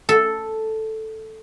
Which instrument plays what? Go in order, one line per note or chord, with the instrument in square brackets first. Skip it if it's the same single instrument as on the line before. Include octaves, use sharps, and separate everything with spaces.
[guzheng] A4